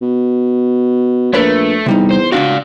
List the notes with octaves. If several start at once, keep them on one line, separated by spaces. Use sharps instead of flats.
B2
A#1 A3 A#4 B4 C#5
E2 C3 G3 D#4
C5
C#2 D4 F#4 D5 F5